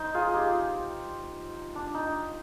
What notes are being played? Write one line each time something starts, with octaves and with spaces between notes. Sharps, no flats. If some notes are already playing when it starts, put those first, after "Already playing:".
Already playing: D#4 C5
F4 G#4
D#4 G4
D4
D#4